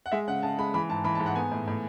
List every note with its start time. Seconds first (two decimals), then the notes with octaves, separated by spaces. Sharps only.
0.06 F#5
0.12 G#3 E5
0.28 C#3 F#5
0.43 C#3 A5
0.58 G#3 B5
0.74 E3 B5
0.89 G#2 A5
1.04 E3 B5
1.15 A5
1.20 G#2
1.26 F#5
1.36 B3 G#5
1.52 A2
1.68 A2